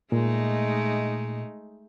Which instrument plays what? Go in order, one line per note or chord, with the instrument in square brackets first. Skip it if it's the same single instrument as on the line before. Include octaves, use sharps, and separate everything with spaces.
[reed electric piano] A#2 [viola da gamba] G#3 A3 D#4